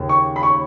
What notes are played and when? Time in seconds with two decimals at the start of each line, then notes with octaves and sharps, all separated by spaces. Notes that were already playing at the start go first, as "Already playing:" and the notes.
Already playing: D#2 C#3
0.09 C#6
0.36 B5
0.43 C#6